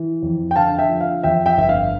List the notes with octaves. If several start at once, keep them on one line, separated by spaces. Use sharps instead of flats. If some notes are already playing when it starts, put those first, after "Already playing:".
Already playing: E3
F2
G5
D3 F5 A5
E5 G5
F3
F5
F2 E5 G5
E5 G5
G1 E5
F5